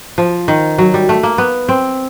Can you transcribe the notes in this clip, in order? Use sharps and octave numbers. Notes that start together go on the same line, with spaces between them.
F3
D#3
F#3
G3
A3
A#3
B3
C4